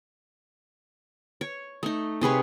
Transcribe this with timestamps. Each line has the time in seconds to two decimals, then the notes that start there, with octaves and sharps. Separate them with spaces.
1.41 C#5
1.83 A3 D#4
2.21 C3 G#4 B4 C#5